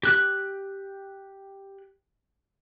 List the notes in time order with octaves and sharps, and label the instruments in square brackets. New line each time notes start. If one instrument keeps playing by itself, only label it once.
[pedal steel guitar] G4 F#6